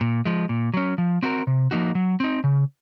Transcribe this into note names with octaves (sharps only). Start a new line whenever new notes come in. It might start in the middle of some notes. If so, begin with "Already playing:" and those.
A#2
F3 G#3
A#2
F#3 C#4
F3
C4 F#4 A#4
C3
F3 A#3 D#4 F#4
F#3
C4 D#4
C#3